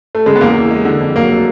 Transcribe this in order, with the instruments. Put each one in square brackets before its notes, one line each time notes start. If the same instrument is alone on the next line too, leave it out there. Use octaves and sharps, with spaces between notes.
[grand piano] A3
[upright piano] C#3 [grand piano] G#3
[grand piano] B3
[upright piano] E2 [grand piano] A#3
[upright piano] E3
G#3
D3
F2
[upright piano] F#3 [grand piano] A#3
[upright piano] A3